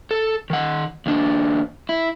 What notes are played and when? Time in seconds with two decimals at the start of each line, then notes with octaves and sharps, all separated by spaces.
0.11 A4
0.50 D#3 F#5
1.06 D#2 D4
1.89 E4